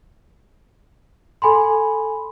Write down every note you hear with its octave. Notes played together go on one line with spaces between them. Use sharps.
A4 G#5 B5 C6